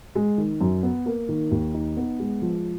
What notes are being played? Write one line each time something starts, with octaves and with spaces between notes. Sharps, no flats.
G#3
D#3
F#2
B3
A#3
D#3
D#2
D#4
B3
G#3
F3